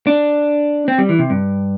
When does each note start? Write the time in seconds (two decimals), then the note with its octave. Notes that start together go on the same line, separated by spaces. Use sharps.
0.07 D4
0.88 C4
0.98 G3
1.09 E3
1.19 C3
1.30 G2